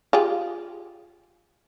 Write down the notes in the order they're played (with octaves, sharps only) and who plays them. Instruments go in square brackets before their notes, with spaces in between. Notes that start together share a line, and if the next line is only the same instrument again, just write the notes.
[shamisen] F4 G4 G#4